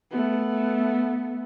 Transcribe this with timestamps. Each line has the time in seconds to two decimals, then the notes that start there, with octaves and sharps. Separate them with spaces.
0.11 A3 B3